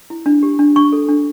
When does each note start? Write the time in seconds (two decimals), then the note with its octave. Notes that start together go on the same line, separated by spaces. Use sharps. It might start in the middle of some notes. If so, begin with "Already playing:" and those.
0.10 E4
0.26 D4
0.43 G4
0.59 D4
0.76 D4 C#6
0.92 A4
1.09 D4